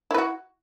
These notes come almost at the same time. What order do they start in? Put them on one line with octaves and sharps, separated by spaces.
E4 B4 F#4